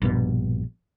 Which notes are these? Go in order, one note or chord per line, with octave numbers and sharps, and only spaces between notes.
A#1 G2 B2